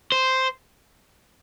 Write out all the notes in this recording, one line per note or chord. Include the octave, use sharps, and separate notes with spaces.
C5